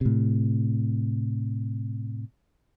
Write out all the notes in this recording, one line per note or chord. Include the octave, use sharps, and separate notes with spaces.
A2 C3